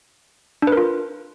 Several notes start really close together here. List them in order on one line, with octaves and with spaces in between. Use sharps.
D4 B4 A#4 F4